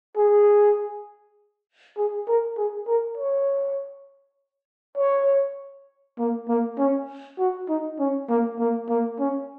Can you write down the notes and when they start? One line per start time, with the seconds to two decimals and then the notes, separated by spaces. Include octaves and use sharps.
0.17 G#4
1.98 G#4
2.28 A#4
2.58 G#4
2.87 A#4
3.17 C#5
4.98 C#5
6.19 A#3
6.49 A#3
6.78 C#4
7.39 F#4
7.69 D#4
8.00 C#4
8.29 A#3
8.60 A#3
8.89 A#3
9.20 C#4